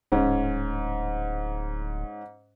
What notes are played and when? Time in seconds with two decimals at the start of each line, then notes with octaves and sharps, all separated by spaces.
0.12 D1 G#2 C#4